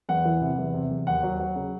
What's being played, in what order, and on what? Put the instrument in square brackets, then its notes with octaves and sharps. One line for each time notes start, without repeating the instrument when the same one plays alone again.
[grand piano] E2 F#5
E3
C3
E2
C3
E2
D#2 F#5
F#3
F#3
C#3